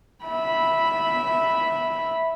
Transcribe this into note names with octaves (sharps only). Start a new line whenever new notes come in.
E5 B5